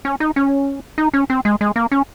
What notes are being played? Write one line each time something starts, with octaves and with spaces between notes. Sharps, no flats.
C#4
D#4
C#4
D#4
C#4
C4
G#3
G#3
A#3
C#4